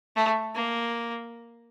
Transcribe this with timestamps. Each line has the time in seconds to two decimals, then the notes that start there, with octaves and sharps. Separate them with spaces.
0.16 A3
0.55 A#3